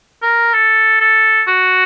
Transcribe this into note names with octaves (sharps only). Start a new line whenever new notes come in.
A#4
A4
A4
F#4